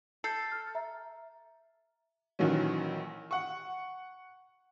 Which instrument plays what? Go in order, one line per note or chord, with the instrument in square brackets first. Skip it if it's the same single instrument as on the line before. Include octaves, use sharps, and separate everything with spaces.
[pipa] A4 [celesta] G6 C7
[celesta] F6
E5 A#5
[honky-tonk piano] A#1 D#3 E3 F#3 C#4
F#5 C#6